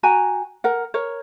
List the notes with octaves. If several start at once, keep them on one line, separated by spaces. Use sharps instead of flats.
F#4 G5 G#5 A#5
A#4 F#5
A#4 C#5